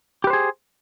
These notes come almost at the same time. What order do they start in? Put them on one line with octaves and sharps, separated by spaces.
G4 B4 C5 G#4